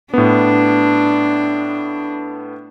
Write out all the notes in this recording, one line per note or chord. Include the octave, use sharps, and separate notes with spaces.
A2 B3 D4